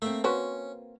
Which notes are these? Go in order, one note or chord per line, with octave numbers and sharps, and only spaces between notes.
A3 A#3 C4 E5
C#4 F#4 B4 C5